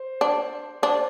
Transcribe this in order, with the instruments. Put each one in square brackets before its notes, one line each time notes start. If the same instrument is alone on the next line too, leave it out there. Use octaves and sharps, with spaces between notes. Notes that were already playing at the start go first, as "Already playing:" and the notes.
Already playing: [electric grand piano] C5
[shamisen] D4
[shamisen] D4 [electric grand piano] C5